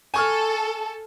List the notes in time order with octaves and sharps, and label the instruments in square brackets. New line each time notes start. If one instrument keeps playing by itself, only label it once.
[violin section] A4 [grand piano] G#5 C#6 F6